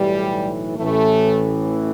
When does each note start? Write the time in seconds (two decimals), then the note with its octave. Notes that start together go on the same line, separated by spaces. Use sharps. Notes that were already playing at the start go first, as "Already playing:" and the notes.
Already playing: B1 A2 E3 G3
0.77 A1 A2 E3 A3